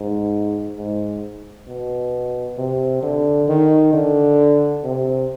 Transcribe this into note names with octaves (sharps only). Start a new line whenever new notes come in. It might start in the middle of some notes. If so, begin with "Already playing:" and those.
Already playing: G#2
G#2
B2
C3
D3
D#3
D3
C3